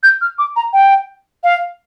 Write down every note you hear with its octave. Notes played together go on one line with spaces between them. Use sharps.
G6
F6
D6
A#5
G5
F5